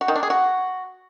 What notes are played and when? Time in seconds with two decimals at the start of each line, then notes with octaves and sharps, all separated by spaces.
0.01 F#4
0.08 D#3
0.16 D4
0.23 G#4
0.30 F#4